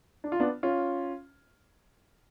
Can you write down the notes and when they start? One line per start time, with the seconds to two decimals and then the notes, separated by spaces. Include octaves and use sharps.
0.24 D4
0.32 F4
0.40 B3 D4
0.63 C#4 F4